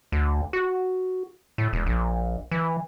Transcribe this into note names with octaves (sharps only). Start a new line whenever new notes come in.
D2
F#4
A2
E1
A#1
E3